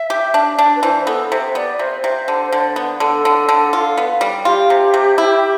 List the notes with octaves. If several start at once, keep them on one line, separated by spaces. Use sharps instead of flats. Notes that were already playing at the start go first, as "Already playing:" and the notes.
Already playing: E5
G4
D4
D4
B4
E3 C5
B3 A4
C3 C5
B3 D5
C3 C5
C3 C5
D3
D3
B3
D3 A4
D3
D3
F4
B3
G3
F4 G4
C3
C3
E4